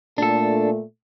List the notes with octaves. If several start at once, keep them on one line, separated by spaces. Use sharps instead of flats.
A#2 A3 D4 A4